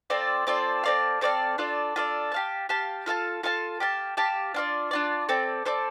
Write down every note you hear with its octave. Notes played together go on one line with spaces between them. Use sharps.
C4 F4 A4 D5
C4 F4 A4 D5
C4 A4 D5 F5
C4 A4 D5 F5
D4 F4 A4 D5
D4 F4 A4 D5
G4 F5 A5
G4 F5 A5
F4 A4 F5 A5
F4 A4 F5 A5
G4 F5 A5
G4 F5 A5
D4 F4 D5
D4 F4 D5
C4 A4 D5
C4 A4 D5